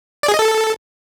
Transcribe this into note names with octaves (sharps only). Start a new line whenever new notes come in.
D5
G#4
D#5
A4